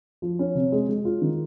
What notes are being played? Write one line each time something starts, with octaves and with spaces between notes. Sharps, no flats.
F3
C#4
C3
G#3
G#3
F4
D#3